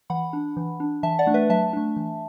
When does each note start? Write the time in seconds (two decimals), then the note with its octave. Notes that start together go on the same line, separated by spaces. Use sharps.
0.10 E3 F#5 B5
0.33 D4
0.57 E3
0.80 D4
1.03 E3 E5 A5
1.19 D5 F#5
1.27 A3 D4
1.34 B4 E5
1.50 F#3 E5 A5
1.73 A3 D4
1.96 E3